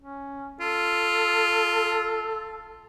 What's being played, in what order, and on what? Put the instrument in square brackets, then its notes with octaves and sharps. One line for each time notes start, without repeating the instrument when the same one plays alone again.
[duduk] C#4
[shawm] F4 [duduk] A4